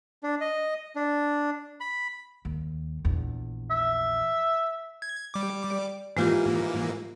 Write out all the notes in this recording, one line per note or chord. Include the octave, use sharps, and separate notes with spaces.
D4
D#5
D4
B5
D#2
A#1 E2
E5
G#6
G3 D6
D5
G#2 E3 G#3 A#3 F4 G4